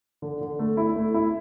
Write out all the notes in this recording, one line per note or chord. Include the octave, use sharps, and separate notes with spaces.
D3
D3
A3
E4
A3
E4